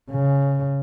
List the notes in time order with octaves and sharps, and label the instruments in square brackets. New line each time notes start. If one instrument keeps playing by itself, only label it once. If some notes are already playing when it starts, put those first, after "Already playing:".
[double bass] C#3